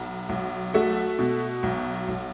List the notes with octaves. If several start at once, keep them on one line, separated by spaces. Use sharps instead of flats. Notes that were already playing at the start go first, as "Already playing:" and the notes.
Already playing: B1
B1
A3 F#4
B2
B1
B1